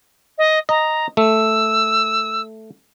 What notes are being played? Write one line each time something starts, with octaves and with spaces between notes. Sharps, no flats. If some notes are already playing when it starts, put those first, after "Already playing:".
D#5
D#5 A#5
A3 E6